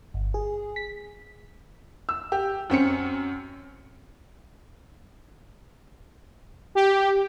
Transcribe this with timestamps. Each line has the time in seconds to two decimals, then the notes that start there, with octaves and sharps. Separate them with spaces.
0.14 G1
0.34 G#4
0.76 B6
2.09 E6
2.32 G4
2.70 F#2 C4 C#4 C#7
6.75 G4